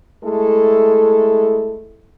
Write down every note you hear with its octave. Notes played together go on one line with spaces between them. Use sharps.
G#3 A3 E4 A4